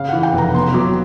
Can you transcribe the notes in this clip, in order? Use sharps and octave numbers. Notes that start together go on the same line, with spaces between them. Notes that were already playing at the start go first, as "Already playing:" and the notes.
Already playing: C#3 F5
E3 F#5
G5
F1
A#5
B3 C6
F#3 D6